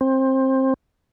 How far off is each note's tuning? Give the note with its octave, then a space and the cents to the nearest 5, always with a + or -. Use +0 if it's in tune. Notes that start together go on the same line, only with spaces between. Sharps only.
C4 +20